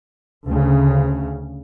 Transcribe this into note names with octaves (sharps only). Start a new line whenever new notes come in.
D2 C#3